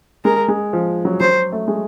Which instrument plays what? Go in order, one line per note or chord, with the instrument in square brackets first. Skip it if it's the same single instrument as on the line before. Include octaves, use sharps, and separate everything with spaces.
[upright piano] G#3 [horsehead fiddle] A#4
[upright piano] G#3
F3
F#3
[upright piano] F#3 [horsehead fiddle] C5
[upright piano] A3
G#3